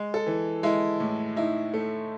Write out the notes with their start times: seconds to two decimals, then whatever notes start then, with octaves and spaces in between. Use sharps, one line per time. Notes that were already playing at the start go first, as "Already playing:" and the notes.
Already playing: G#3
0.14 A4
0.26 E3
0.63 G#3 E4
1.00 A2
1.36 D#4 E4
1.74 A3